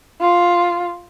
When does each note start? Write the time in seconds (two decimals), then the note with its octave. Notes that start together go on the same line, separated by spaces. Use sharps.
0.21 F4